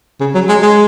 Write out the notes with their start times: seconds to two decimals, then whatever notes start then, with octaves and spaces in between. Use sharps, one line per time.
0.20 C#3
0.35 F#3
0.49 G#3
0.62 G#3